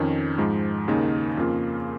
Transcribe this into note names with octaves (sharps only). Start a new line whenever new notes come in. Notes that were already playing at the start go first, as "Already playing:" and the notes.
Already playing: F2 D#3 C#4
G#2 F3 G#3
D#2 C#3 A#3 D#4
F2 C#3 A#3 F4